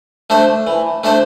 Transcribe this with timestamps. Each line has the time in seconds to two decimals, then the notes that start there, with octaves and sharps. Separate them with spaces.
0.30 A3 D4 A4 C5
0.67 E3
1.04 A3 D4 A4 C5